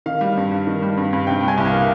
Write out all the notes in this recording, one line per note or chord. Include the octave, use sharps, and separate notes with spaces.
D#3 F5
G3
G2
G2
D#3
G3
G2
G2
C3 G5
G3
G#5
C2
F5
A#3